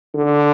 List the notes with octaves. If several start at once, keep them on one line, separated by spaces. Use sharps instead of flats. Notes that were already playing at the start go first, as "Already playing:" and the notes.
D3